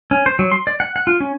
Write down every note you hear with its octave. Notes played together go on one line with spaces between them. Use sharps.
C#4
C5
F#3
C6
D5
F#5
F#5
F4
C#4